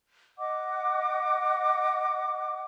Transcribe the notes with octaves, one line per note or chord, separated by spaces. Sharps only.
D#5 F#5 D6